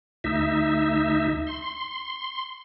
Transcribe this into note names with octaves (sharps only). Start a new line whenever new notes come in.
D2 D#4 E5
C6